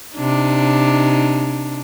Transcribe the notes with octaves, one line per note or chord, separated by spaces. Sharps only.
C3 D4 D#4